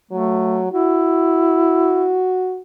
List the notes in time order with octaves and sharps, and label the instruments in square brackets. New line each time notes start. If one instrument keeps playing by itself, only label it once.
[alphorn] F#3 [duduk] A3
[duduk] E4 [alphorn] F#4